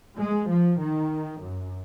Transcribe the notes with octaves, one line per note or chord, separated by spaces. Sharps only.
G#3
F3
D#3
F#2